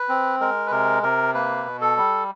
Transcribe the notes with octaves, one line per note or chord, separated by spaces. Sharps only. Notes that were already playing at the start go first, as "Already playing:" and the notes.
Already playing: B4
C4
G#3 A#4
B4
C3 A#4
C3 A#4
A#3 B4
B2
A4
G3